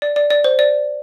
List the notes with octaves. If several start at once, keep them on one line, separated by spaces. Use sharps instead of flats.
D5
D5
D5
C5
D5